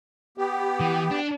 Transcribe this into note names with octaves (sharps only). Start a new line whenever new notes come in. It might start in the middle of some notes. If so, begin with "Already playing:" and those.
B3 G4
E3
D4